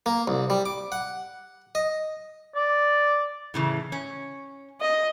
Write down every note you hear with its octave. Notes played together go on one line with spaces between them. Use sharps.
A#3
C2
G3
D6
F#5
D#5
D5
A2 C#3 E3
C#4
D#5